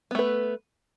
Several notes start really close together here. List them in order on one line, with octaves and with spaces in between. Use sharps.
B3 A3 B4